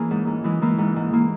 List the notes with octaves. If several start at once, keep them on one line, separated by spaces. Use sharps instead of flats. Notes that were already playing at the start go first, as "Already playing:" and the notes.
Already playing: E3 A#3 C#4 G#4
G#2
G#2
E3 G#3
E3 A#3
G#2
G#2
E3 A#3